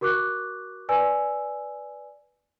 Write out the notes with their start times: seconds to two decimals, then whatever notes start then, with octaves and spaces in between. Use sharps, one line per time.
0.01 F#4 A#4 C#6 D6 F#6
0.89 B4 D5 G#5 E6